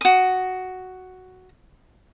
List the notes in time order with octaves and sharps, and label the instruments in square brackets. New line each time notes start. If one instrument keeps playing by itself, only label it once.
[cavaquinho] F#4 D#6